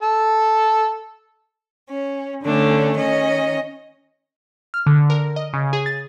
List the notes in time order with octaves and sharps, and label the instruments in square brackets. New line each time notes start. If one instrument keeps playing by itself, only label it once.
[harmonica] A4 A5
[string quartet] C#4
D3 A3 C#4 D4
D#3 C#4 D#5
[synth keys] F6
D3
A#4
D#5
C#3
G#4
A6